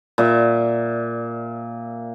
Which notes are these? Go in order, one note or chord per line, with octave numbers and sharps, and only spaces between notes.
A#2 E5